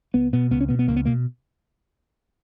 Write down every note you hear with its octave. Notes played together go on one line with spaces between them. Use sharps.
C#2 B3
B2 B3
C#2 B3
C#4
B2 B3
B3
C#2 A#3
B3
B2 A#3